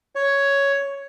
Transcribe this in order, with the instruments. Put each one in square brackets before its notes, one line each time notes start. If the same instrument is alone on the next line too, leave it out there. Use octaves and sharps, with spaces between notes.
[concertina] C#5